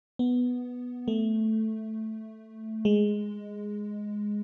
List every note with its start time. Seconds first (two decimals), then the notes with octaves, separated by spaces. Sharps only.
0.19 B3
1.08 A3
2.85 G#3